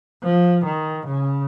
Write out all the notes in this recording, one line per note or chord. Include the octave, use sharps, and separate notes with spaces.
F3
D#3
C#3